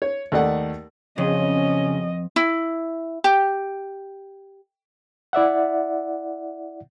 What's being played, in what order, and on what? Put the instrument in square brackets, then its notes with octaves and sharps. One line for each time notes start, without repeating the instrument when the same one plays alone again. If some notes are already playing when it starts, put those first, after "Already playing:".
[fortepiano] C#5
D#2 A3 D5 F#5
[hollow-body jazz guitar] F2 [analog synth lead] C#3 [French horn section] F#3 B3 C#4 [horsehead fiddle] D#5
[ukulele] E4
G4
[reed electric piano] E4 D5 E5 F#5